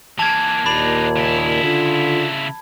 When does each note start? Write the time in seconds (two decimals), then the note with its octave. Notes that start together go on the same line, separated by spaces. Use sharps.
0.19 E3 A#3 A5 G#6
0.66 D#2 A#2 D4 D#4 B5
1.16 C#3 E4
1.63 D3 F4